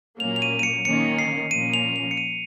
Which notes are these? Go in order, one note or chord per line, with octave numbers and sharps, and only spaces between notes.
A#2 F#3 A#3 C#4 F7
F7
D#7
D#7
C#7
D#3 A#3 C#4 C#7
C7
A#2 F3 A#3 C#4 D#7
F7
F7
C#7
D#7